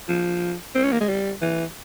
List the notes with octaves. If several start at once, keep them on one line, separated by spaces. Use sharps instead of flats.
F3
C4
C#4
A#3
G#3
G3
E3